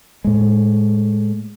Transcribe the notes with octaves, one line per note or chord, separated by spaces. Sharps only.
A2 G#3